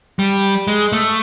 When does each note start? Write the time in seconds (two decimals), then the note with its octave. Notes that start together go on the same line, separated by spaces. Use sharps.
0.19 G3
0.68 G#3
0.92 A3